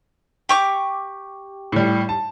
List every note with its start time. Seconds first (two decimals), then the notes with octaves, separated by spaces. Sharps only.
0.49 G4 C#6 D6
1.72 A2 G3
2.09 A5